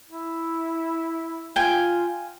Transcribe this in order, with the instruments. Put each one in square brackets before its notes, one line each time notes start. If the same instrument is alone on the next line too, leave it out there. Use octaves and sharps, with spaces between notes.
[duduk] E4
[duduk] F4 [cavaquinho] G5 G#5